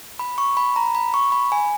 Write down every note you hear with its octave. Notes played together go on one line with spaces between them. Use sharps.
B5
C#6
B5
A#5
B5
C#6
B5
G#5